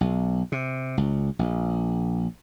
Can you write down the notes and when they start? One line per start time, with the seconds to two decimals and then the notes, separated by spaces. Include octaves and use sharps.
0.01 B1
0.52 C3
0.98 C#2
1.39 A#1